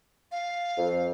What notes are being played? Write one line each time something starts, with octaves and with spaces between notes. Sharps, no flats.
F5
F2